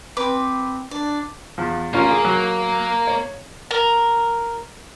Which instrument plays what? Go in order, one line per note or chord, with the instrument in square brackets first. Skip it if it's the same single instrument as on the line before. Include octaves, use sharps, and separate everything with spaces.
[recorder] C4 [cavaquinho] B4 D6
[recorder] D4 [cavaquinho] D5
[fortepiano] E2 F3
[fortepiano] A1 C#4 F4 [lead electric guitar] A#3 A#4
[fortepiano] G#4
F#3
C#5
[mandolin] A#4